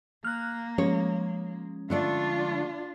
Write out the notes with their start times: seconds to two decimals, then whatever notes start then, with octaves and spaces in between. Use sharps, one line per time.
0.24 A#3 F6 F#6
0.78 F3 G#3 C#4 C#5
1.90 D3 A3 D4 F4 D5